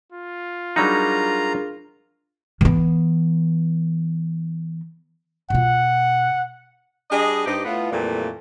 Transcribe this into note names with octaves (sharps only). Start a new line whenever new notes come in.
F4
F#3 G3 D4 D#4 G#4 A#4 A#5
E3 B3
B2 F4 F#5
G3 D4 G#4 D#5
G2 D4 D#4 G4 C5 D#5
A2 B3 F4
F2 A#2 E3 G3 A3 A#3